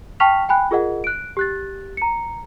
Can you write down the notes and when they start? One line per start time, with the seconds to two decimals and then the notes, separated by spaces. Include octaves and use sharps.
0.20 G5 A5 C#6 F6 B6 F7
0.49 G5 G#5 B5 F#6
0.71 F4 G#4 A#4 D#5 F#5
1.04 F#6 D7
1.37 G4 F#6 A6
1.97 A#5 C#7